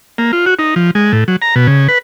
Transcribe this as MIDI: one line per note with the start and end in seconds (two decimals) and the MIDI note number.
0.18 0.32 58
0.33 0.45 65
0.46 0.54 66
0.59 0.75 63
0.76 0.91 53
0.95 1.12 56
1.13 1.24 45
1.28 1.36 54
1.42 1.55 82
1.56 1.67 47
1.67 1.88 49
1.88 1.98 71